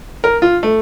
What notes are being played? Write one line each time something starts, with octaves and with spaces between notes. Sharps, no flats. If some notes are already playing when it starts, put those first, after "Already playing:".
A#4
F4
A3